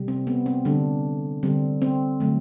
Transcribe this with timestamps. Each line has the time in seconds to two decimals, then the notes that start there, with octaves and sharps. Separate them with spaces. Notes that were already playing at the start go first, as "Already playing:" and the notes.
Already playing: C3 G3
0.08 C4
0.27 B3
0.46 C4
0.65 D3 G3 D4
1.43 D3 G3 C4
1.82 C4
2.20 D3 F#3 A3